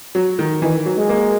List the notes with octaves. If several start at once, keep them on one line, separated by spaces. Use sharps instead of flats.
F#3
D#3
D#3 E3
F#3
G#3
A#3